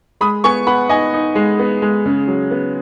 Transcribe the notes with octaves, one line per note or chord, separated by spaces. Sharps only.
G#3 B5 D#6
B3 G#5 C#6
B3 F#5 B5
D#4 D#5 G#5
D#4
G#3
B3
G#3
C#3
F#3
B3